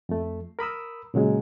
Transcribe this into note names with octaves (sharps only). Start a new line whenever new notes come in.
F2 A3
A#4 B5 D#6 E6
A#2 C#3 F#3 G#3